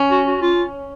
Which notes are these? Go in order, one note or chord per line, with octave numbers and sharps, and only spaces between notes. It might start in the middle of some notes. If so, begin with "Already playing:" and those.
Already playing: C#4
F#4
F#4
F4